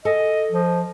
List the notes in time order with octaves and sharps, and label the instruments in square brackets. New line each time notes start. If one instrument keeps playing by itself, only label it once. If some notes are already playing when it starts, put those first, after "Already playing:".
[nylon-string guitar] A4 G#5 [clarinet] D#5
[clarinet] F3